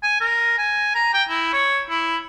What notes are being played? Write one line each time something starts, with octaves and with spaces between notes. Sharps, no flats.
G#5
A#4
G#5
A#5
G5
E4
C#5
E4